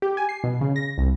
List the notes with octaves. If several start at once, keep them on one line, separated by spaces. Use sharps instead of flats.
G4
G#5
C7
B2
C#3
A#6
C2